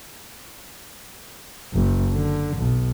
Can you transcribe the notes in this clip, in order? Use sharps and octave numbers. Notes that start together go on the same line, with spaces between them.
F#1
D3
B1